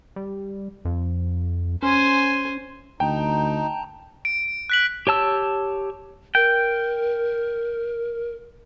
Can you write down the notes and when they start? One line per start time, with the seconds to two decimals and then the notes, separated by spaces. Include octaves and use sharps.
0.16 G3
0.85 F2
1.83 C#4 C5 G#5
3.00 D2 D#4 G5 A5 A#5
4.25 D7
4.70 F#6 B6 F#7
5.07 G4 C#5 A5 E6
6.35 A#4 G5